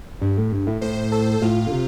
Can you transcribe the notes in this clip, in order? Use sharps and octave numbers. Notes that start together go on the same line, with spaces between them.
G2
A2
G2
A2
A2 C5
A4
A2 F4
D3
C3